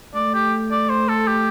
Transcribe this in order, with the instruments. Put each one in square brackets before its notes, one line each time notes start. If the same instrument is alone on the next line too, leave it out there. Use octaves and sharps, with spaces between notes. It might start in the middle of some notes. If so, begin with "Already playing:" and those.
[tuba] A3 [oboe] D5
[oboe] G4
D5
C5
A4
G4